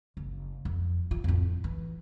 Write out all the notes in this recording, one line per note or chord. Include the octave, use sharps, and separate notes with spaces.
F#1
F2
D4 F4
F2 A2
E3